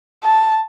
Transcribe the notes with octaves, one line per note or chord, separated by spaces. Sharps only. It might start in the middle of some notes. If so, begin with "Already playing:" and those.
A5